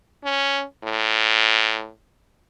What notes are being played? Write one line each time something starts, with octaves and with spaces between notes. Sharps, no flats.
C#4
A2